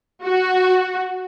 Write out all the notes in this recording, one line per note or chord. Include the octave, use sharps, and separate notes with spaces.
F#4